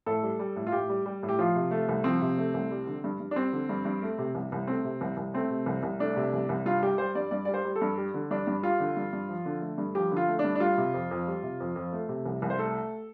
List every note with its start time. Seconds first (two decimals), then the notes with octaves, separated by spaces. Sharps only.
0.06 A2 A4
0.23 G3
0.39 G3
0.56 A2
0.67 F4
0.72 A2 G4
0.89 G3
1.06 G3
1.23 A2
1.29 G4
1.39 F3 F4
1.56 C3
1.71 A3
1.89 C2
2.04 F3 C4
2.22 C3
2.38 A3
2.54 C2
2.71 G3
2.87 D3
3.04 G2
3.20 G2
3.31 D4
3.36 G3 C4
3.53 D3
3.69 G2
3.85 G2
4.02 A3
4.19 C3
4.35 C2
4.52 C2
4.68 A3 C4
4.85 C3
5.01 C2
5.17 C2
5.34 A3 C4
5.50 C3
5.66 C2
5.83 C2
6.00 A3 D4
6.17 C3
6.33 C2
6.49 C2
6.66 G2 F4
6.83 G3 G4
6.98 G3 C5
7.15 G2 D5
7.31 G2 D5
7.45 D5
7.48 G3
7.54 C5
7.65 G3
7.76 A4
7.82 G2
7.97 G3
8.14 D3
8.31 G2 D4
8.47 G2
8.63 G3 F4
8.80 D3
8.97 G2
9.13 G2
9.29 F3
9.45 D3
9.62 A3
9.78 G2
9.95 F3 G4
10.11 D3
10.17 F4
10.28 A3
10.39 D4
10.44 G2
10.55 D4
10.60 G3 F4
10.78 C3
10.94 F2
11.11 F2
11.27 G3
11.43 C3
11.60 F2
11.76 F2
11.93 A3
12.09 C3
12.26 C2
12.42 C2
12.50 C5
12.58 A3 A4